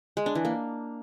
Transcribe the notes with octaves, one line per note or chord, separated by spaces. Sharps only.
G#3
D4
E3
A#3